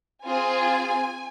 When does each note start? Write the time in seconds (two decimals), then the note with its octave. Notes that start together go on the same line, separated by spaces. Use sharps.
0.25 C4 F4 G#4 G#5